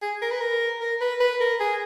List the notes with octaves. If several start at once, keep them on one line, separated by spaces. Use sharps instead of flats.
G#4
A#4
B4
A#4
A#4
B4
B4
A#4
G#4